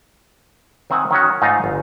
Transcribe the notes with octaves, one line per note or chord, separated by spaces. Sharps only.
D#3 C4 E5 F#5 G#5
D#3 C#4 F#4
G#2 A3 D#4 F4 D#5 F5
G1